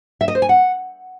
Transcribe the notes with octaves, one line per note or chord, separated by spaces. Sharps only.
E5
D#5
C5
G#5
F#5